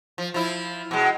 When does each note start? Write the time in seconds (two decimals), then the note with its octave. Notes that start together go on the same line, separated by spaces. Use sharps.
0.18 F3
0.34 F3 E4
0.91 B2 G#3